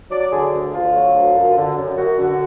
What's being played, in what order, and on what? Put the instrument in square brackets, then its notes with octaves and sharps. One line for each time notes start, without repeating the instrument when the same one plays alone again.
[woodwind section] F#3 D5
D3 G#4
D2
D2 F4
F#3
D2
F#2
D3
F#2
F#2 F#4
D3